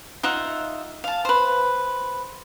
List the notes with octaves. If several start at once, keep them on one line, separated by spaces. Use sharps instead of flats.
D#4 F4 E5 F#5
F5 A5
B4 C5